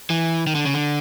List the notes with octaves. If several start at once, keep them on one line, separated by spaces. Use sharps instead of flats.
E3
D#3
D3
C#3
D3